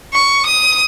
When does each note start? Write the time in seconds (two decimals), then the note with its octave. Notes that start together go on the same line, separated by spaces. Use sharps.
0.14 C#6
0.46 D#6